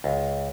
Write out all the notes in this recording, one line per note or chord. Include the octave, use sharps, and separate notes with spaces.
C#2